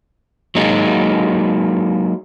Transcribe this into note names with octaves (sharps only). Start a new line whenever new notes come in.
F#3 G#3 A#3 D#4 F#4 G#4